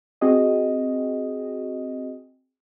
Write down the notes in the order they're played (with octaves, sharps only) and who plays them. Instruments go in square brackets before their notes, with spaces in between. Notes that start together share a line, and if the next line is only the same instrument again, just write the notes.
[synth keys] C4 F#4 G#4 D#5